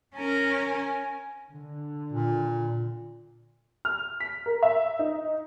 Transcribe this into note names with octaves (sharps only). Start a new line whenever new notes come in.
C#4 A#4 G#5
D3
A#2
F6
B6
A#4
E5
D#4